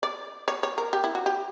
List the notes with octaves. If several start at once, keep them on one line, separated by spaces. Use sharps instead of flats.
D5
C#5
C#5
A#4
G4
E4
F#4
G4